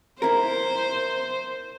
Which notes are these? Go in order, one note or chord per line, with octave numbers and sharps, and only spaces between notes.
E4 A#4 C5